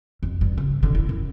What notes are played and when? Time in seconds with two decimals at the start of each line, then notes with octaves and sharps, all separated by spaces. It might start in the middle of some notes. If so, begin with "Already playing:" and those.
0.23 F2
0.41 G2
0.58 C#3
0.83 B2 D3
0.95 E4
1.09 F#2